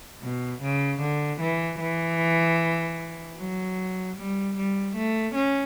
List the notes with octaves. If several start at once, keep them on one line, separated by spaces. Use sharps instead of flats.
B2
C#3
D3
E3
E3
F#3
G3
G3
A3
C#4